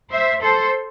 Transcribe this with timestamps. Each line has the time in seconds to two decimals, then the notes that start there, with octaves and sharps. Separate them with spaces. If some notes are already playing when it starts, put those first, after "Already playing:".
0.10 C5 E5
0.42 A4 C5